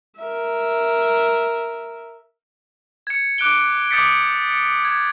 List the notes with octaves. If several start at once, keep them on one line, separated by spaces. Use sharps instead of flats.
A#4 E5
G#6 C#7
D6 F#6 D7 G7
D6 D#6 G6 A6 B6 C#7
C#7
G#6